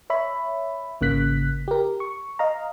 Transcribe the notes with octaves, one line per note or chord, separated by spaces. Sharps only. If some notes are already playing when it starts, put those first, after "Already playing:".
C#5 E5 B5
G#1 C#3 A#3 F#6 B6
G4 A#4
C#6
D#5 F5 A#5